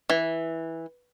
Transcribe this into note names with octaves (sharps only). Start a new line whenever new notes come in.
E3